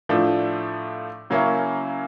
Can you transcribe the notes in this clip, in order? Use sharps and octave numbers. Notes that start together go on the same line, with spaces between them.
A2 F3 A3 D4
C#3 F#3 A#3 C#4 E4